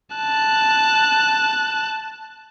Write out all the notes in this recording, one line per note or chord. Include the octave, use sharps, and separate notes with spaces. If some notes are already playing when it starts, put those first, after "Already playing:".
A5 F#6